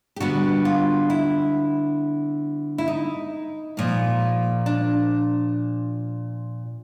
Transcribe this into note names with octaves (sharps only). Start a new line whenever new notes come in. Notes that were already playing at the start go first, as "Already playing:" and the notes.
G4
D3 G3 B3 F#4
F4
E4
E4
D#4
A#2 F3 A#3
D4